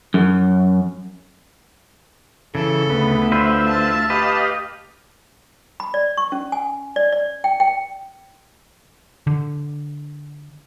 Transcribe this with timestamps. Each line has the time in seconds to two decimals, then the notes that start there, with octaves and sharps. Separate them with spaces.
0.14 F#2
2.55 C#3 E3 A4
2.90 D2 B3
3.32 D3 F4 B4 C5 E5
3.68 A5 A6
4.10 G4 B4 D#5 F5
5.80 B5
5.94 D5
6.17 C#6
6.32 C#4
6.52 G#5
6.96 D5
7.13 D5
7.44 G5
7.60 G5
9.27 D3